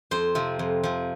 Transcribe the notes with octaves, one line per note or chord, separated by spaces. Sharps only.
F2 C5
C3 F3
F2
C3 F3